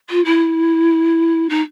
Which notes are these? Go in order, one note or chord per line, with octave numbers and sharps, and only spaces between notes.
F4
E4
D#4